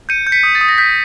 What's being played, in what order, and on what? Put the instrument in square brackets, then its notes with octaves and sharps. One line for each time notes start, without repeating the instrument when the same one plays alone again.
[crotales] G6 C#7 D#7
G6
B6 C#7
D#6
A6
D#6
A#6
G6 B6